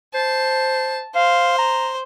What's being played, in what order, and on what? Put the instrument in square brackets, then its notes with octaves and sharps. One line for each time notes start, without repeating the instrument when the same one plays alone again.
[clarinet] C5 [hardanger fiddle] A5
[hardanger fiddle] C5 [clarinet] F5
[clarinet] A#5